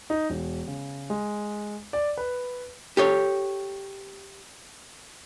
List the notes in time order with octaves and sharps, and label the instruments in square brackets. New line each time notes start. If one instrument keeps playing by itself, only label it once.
[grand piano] D#4
E1
C#3
G#3
D5
B4
[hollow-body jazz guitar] G4 A4 C#5